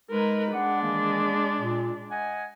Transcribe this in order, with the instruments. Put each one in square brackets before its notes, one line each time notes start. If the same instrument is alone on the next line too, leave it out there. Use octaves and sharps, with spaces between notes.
[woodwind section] G#3 D#4 [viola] A#4 B4
[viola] G#3 D4 [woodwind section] F#5
[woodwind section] D#3 E3 A#3
A#2
D#5 F#5 G#5